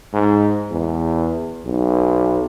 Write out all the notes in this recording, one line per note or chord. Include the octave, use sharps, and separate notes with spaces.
G#2
E2
B1